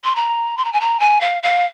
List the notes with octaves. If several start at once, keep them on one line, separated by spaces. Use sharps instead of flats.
C6
A#5
C6
A#5
G#5
A#5
G#5
F5
F5